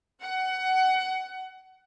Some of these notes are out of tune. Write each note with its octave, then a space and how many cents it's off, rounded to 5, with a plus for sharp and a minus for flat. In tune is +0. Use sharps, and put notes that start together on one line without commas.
F#5 +20